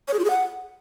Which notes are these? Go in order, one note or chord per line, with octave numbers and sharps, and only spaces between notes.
C#5
G#4
F4
G#4
F#5